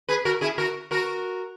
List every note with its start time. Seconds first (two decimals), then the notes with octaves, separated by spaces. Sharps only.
0.09 G#4 B4
0.25 F#4 A#4
0.41 E4 G#4
0.58 F#4 A#4
0.91 F#4 A#4